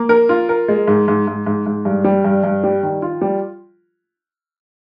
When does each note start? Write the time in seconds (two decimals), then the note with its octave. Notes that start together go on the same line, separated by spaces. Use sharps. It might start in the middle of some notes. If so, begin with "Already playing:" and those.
Already playing: A#3
0.09 A#4
0.29 F4
0.49 A#4
0.68 G#3
0.88 G#2
1.08 G#2
1.27 G#2
1.46 G#2
1.66 G#2
1.85 G2
2.04 G3
2.24 G2
2.44 G2
2.64 G3
2.83 D#3
3.02 F4
3.21 G3